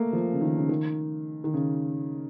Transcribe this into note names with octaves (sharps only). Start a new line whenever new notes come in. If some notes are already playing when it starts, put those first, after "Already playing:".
Already playing: A3 A#3
F3
C#3
D#3
C#3
D#3
D#3
C#3